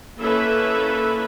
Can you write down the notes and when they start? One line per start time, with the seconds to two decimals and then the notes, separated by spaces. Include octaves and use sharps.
0.19 A#3 C#4 E4 A4 B4 E5